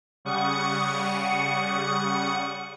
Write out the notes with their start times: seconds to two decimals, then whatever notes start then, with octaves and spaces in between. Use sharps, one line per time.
0.25 C#3 G3 F#5 C#6 D#6 C#7